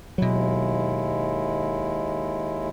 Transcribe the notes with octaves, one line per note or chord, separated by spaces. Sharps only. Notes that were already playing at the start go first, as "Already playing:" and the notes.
D#2 B2 F#3 G#3 E4